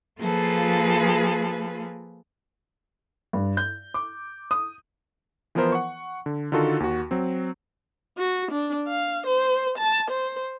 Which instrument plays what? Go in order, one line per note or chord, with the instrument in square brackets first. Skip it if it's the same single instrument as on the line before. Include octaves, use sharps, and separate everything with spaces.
[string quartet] F3 A#3 F4 G#4 A4 B4
[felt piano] G2
G6
D6
D#6
[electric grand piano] E3 F3 B3 E4 A#4 C5
F#5 C#6
D3
D3 D#3 D#4 F4 F#4 A4
D#2 F#4
F#3 C4
[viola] F#4
D4
F5
C5
A5
C5